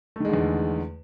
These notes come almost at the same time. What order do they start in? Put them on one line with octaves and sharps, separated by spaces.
A3 D#3 G#3 D3 E2